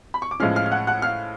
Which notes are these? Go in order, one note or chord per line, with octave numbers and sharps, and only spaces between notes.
B5
C#6
D6
A2 F3 G#3 C#4 F5 F6
F5 F6
F6
F#5 F#6
F#5 F#6
F5 F6